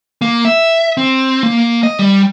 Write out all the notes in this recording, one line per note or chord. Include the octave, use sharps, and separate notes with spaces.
A#3
E5
C4
A#3
D#5
G3